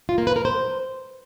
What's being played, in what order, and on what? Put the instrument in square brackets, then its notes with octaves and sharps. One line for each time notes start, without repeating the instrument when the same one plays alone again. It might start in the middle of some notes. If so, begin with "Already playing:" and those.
[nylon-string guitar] F4
A#3
B4
A#4
C5